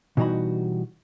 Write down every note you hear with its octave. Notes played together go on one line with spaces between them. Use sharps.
B2 E3 G3 D#4 F#4 B5